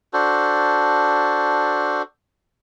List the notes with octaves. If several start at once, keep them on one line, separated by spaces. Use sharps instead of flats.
D4 F#4 A4 C5